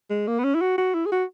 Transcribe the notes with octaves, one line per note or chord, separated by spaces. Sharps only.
G#3
A#3
B3
C#4
E4
F#4
F#4
E4
G#4
F#4